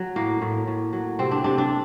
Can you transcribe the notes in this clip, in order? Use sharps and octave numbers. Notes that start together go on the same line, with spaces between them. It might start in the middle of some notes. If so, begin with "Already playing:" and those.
Already playing: F#3
A2 A#3
A2
A2
F#3
C3 C4
D4
C3 D4
D4